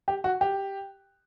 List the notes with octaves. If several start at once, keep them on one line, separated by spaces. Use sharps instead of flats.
G4
F#4
G4